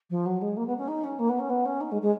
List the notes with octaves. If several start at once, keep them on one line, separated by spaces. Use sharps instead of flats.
F3
F#3
G#3
A#3
B3
C#4
D#4
C#4
A#3
B3
C#4
B3
C#4
D#4
G#3
G#3